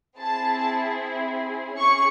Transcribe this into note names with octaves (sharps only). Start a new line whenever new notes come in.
C4 E4 G#4 A5
C#4 G#4 C#6